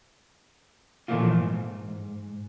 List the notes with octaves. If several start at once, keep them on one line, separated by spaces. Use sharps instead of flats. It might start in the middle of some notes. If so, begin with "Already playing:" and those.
A#2 E3 F3 A3 A#3 F4
G#2